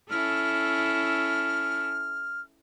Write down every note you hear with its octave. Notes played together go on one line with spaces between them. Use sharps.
C#4 E4 A4 F6